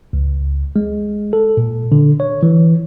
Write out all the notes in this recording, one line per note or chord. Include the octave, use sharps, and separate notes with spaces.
C#2
G#3
A4
A#2
D3
C#5
E3